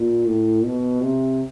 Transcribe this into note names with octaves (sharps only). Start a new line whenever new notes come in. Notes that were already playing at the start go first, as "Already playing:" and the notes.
Already playing: A#2
A2
B2
C3